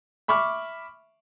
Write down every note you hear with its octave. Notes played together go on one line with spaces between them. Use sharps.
E5 B5 C#6 D6 F6